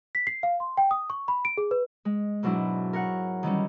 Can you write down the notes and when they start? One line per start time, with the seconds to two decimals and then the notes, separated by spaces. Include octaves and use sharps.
0.15 B6
0.27 C7
0.43 F5
0.60 C6
0.77 G5
0.91 D#6
1.10 C#6
1.28 B5
1.45 D7
1.57 G#4
1.71 B4
2.05 G#3
2.43 G#2 B2 F#3 D4 E4
2.93 A#4 C#5 F#5
3.43 D#3 E3 G3 C#4